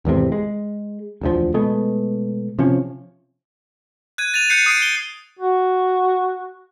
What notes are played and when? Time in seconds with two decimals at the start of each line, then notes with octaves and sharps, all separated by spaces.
0.05 G#1 E2 A2 C3
0.32 G#3
1.21 E1 D2 F3
1.54 B2 G#3 A3 B3
2.59 C3 F3 C#4
4.18 F#6 G#6 D#7
4.34 A6 D#7 F7
4.50 F#6 G6 C7 C#7
4.66 D#6 C7 D7
4.82 G7
5.39 F#4